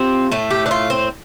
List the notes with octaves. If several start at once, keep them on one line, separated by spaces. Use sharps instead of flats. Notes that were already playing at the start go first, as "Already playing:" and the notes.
Already playing: C3 F3 C4
A2 A3
G4
D4
F4
C4